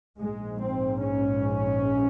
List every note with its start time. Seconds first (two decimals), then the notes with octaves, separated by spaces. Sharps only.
0.20 A#1 G#2 G#3
0.61 C4
1.01 C#4